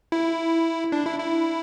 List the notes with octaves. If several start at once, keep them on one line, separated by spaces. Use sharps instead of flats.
E4
D4
E4
E4